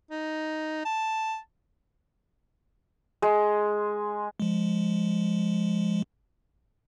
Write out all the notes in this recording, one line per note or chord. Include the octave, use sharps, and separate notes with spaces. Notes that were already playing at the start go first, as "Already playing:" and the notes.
D#4
A5
G#3
F3 G#3